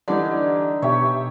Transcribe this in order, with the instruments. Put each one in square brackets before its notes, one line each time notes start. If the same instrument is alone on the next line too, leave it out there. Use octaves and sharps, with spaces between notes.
[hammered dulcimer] D3 D#4 [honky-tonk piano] E3 G3 [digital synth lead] D5
[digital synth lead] B2 [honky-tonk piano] G4 E5 [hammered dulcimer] C#5